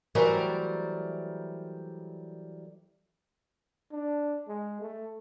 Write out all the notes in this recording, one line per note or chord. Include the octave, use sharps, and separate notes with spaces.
E3 F#3 G3 A3 A#4 C5
D4
G#3
A3